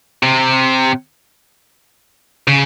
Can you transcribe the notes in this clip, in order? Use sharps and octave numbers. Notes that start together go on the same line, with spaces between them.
C3
C#3